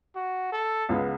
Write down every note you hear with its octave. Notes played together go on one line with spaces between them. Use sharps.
F#4
A4
C#2 C#3 G#3 B3 E4